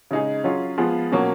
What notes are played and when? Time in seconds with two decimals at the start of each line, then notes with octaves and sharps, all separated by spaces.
0.11 C#3 G#3 D#4 G#4
0.44 F#3 C#4 F4 G#4
0.78 F3 G#3 B3 F4 G#4
1.12 B2 F#3 A#3 C#4